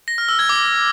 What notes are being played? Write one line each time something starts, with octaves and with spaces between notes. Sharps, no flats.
A#6
F6
E6
G#6
D6